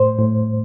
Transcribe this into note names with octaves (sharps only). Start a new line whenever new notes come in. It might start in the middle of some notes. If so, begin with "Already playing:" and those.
Already playing: A2 C5
A2